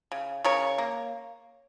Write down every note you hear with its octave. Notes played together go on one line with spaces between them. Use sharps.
C#3
C#3 A#4 C#5
A#3